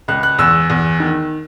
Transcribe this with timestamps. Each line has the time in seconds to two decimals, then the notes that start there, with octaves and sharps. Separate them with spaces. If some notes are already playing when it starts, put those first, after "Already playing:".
0.08 C#2 F#6
0.23 F#6
0.39 E2 E6
0.70 E2
1.00 D#3